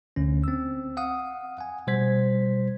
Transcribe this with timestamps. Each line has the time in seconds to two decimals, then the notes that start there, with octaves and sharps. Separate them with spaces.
0.16 D2 D3 C#4
0.44 C4 E6
0.97 F5 F#5 D#6
1.58 F#5 G#5
1.87 B2 G3 C5 G#6 B6